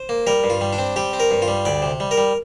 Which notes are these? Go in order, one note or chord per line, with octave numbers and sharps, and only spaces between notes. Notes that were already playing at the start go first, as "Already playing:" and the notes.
Already playing: C5
A#3
G3 A#4
G2
F4
G3
D4
C4
G3 G4
C4
A#4
G2
F4
G3
D2 D5
C3
G3
A#4
G3